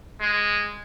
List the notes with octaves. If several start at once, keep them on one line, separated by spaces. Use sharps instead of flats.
G#3